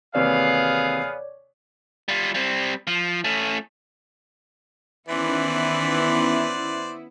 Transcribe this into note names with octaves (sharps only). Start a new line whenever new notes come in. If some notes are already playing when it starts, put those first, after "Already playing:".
D#2 C3 E3 B3 G#4 C#5 D5 F5
G3 F4
G3 C4
F3
A3 C#4
D#3 E3 B3 C#4 E4 B4 C5 D5